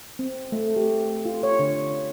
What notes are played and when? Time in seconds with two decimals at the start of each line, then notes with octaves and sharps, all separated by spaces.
0.19 C4
0.52 A3
0.76 G4
1.25 F4
1.43 C#5
1.59 D3